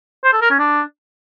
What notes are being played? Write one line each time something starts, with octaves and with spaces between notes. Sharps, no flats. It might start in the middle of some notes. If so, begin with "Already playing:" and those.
C5
A4
A#4
C#4
D4